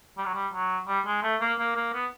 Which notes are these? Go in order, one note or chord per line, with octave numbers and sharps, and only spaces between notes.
G3
F#3
G3
F#3
G3
G#3
A3
A#3
A#3
A#3
B3